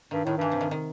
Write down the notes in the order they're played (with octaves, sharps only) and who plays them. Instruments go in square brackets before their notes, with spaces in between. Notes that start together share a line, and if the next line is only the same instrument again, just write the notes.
[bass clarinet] G2 [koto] D#3
[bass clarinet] A2 [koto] D#3
[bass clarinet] G2 [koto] E3
[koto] C3
D#3
D#3